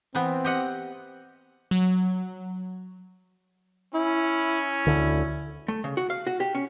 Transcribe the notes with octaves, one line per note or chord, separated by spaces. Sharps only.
E3 B3 C4
G4 D#5 F#5
F#3
C#4 E4
D2 D3 E4
A3
C#3
F#4
F5
F#4
G4
C#4